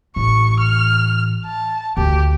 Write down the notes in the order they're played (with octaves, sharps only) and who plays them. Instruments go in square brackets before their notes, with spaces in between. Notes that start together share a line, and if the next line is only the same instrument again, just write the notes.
[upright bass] A1 [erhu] C#6
[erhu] F6
A5
[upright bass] D2 [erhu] G4